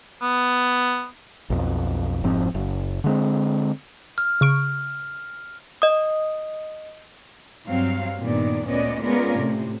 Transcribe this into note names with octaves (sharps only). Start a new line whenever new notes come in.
B3
B1 F2
F1 G#2 F3 C4
F#1
D3 G#3 C4
F6
C#3 C#6 D7
D#5 D#6
G2 F#3 C4 F5
G2 A#2 D#3 B3 D5
D2 A#2 B3 C#4 D5 D#5
G#3 B3 C#4 F4 A#4 D5
A2 C3